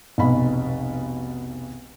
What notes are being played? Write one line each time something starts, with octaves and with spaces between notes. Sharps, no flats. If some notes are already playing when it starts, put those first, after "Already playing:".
F1 B1 B2 B5